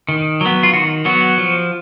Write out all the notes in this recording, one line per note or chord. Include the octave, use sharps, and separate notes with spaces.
D#3
F#3 B3
F4
D#3 F#4
F#3 B3 F#4
F3